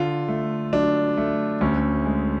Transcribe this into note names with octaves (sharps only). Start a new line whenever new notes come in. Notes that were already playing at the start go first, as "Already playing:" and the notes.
Already playing: D3 F4
A3
F#3 D4
A3
D2 C#4
G#3